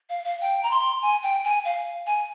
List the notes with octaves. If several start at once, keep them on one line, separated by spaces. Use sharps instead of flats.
F5
F5
G5
A#5
C6
G#5
G5
G#5
F5
G#5